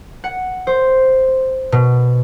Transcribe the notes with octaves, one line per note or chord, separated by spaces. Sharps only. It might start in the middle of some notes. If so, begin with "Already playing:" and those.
F#5
C5
B2